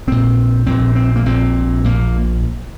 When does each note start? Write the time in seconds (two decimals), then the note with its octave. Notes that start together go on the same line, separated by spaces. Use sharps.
0.07 A#1 A#2 C4
0.66 A#1 A#2 C4
0.96 C4
1.16 A#3
1.26 A#1 A#2 C4
1.84 A#1 A#2 A#3